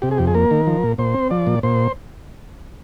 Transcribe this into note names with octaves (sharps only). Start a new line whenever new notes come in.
C3 G4
G#4
F2 G4
G#4
A#3 A#4
D#3
F3
A#2
A#2 C5
C4
F3 D5
A#2
A#2 C5